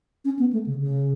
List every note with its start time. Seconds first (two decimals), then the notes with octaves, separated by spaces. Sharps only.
0.25 C#4
0.39 B3
0.53 A3
0.67 C#3
0.81 C#3